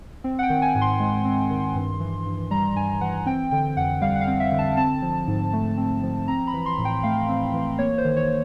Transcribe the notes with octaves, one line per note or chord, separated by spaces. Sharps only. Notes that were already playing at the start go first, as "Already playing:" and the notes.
C4
F#5
G5
D#3
G#5
G#2
C6
G#3
C4
D#3
G2
E3
G2
G3 A#5
G2 G#5
E3 F#5
C4 G5
D3 G5
F2 F#5
G3 F5
F#5
F5
C4
E5
D3
A5
C4 A5
F3
G#2
A3
C4
F3
C4 A#5
B5
E3
C6
A2
G5
A3 F5
C4
E3
A#3 C#5
C5
D#3
C#5